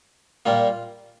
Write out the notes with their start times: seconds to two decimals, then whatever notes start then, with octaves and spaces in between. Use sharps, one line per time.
0.46 A#2 G3 A#3 F4